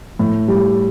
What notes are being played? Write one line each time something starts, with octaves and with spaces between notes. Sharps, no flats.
A2
G3